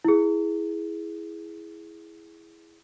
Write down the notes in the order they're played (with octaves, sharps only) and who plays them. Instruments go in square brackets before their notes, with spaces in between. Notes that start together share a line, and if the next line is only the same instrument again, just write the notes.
[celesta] E4 G#4